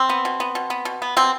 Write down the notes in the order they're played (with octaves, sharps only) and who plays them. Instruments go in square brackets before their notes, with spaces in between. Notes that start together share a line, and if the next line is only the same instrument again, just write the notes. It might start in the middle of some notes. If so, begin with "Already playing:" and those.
Already playing: [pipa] C4
B3
B2
B3
B2
B3
B2
B3
B2 C4